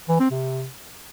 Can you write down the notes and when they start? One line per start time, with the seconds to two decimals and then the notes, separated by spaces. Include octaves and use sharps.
0.09 E3
0.20 C4
0.31 C3